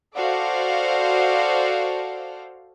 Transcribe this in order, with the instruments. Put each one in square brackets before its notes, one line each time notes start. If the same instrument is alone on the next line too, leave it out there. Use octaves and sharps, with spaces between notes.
[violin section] F#4 A4 C5 D5 F5